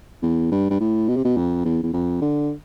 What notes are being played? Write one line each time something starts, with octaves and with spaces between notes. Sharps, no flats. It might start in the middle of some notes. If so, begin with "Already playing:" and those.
E2
G2
G2
A2
B2
C3
B2
F2
E2
E2
F2
D3